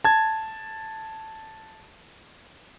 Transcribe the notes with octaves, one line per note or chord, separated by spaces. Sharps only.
A5 G#6